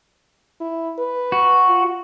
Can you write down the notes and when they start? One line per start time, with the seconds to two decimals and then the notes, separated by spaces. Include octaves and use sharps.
0.61 E4
0.98 B4
1.32 F#4
1.68 F4